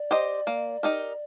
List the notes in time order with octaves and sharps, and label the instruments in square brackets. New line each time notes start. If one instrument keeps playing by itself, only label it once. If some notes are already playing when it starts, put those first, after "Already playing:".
Already playing: [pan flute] D5
[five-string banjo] G4 C5 D#5
A#3
D#4 G4 A#4